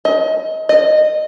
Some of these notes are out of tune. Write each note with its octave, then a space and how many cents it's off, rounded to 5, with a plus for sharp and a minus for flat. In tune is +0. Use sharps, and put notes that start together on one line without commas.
D#5 +25
D#5 -20